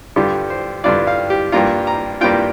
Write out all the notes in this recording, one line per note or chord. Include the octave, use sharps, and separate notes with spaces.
G2 D3 G3 D4 F4 G4
C5
G2 D3 G3 D4 F4 D5
F5
G4
G2 G3 A#3 D4 F4 A#5
A#5
G2 G3 A#3 D4 F4 G5